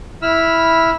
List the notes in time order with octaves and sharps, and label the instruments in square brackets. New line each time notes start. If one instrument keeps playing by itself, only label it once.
[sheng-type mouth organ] E4 B5 E6 F6